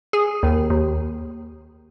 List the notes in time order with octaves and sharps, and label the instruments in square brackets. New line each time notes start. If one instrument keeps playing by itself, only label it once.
[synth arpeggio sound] G#4
D#2
D#2